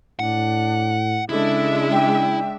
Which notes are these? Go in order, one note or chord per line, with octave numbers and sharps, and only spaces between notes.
A2 D4 F#5
C#3 G#3 D4 E4 A4 E5
G5